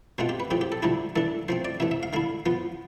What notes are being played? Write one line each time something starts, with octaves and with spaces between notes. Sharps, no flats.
B2 A3 C4 F4 C5
G4
B4
A2 F3 C4 G4
G4
A4
D3 F3 A3 E4 G4
E3 A3 D4 A4
F3 A3 C4 C5
D5
C3 E3 A3 E5
E5
F5
D3 A3 E4 F5
F3 B3 F4